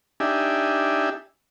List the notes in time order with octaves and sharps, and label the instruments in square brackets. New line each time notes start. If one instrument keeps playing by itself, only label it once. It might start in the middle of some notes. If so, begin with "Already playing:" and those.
[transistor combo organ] D4 D#4 G4 E5 G#5